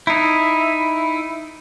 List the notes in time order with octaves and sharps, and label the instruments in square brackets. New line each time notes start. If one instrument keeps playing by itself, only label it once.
[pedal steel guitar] D#4 E4